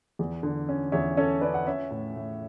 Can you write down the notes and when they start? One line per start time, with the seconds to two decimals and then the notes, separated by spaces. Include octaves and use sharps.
0.19 E2
0.43 D3
0.69 C#4
0.92 E2 C#5 E5
1.17 C#4 A4 C#5
1.41 C#4 B4 D5
1.54 F#5
1.66 C#4 C#5 E5
1.91 A2
2.16 A2